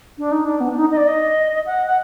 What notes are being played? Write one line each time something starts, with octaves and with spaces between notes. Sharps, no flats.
D4
D#4
D4
B3
D4
D#4
D#5
D5
D#5
F#5
F#5